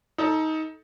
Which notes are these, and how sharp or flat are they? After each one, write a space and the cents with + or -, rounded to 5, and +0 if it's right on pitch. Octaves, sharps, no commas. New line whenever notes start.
D#4 +20 A4 +0